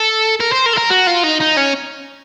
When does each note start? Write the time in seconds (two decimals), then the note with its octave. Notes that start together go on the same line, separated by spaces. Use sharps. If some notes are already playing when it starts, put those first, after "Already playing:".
Already playing: A4
0.40 A#4
0.52 C5
0.66 A#4
0.73 A4
0.77 A#4
0.90 F#4
1.07 F4
1.24 D#4
1.41 D#4
1.57 C#4